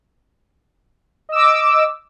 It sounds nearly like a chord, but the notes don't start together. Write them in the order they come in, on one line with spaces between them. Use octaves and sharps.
D#5 E6 D6